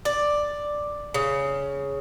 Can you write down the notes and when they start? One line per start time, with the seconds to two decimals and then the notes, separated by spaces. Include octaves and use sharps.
0.05 D5
1.14 C#3